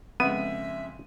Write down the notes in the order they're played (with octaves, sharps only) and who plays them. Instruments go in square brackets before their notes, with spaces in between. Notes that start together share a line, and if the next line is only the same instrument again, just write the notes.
[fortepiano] F2 C#3 G#3 [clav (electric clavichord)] B3 [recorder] E5 [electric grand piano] D#7